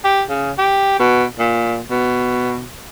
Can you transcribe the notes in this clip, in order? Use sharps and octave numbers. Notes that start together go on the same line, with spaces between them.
G4
C#3
G4
B2
A#2
B2